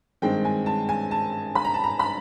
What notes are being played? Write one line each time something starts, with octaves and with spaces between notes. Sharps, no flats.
G2 D#3 G#3 C4 G5
G#5
A5
G#5
A5
B5
A#5
A5
A#5
B5